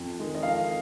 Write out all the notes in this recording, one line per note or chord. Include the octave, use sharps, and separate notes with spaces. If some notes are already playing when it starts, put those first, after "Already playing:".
Already playing: F2
D#3 G#3
D#5
F2 F5